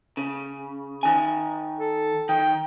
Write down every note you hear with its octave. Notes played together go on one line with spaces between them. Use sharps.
C#3
D#3 G#5
A4
D#3 G5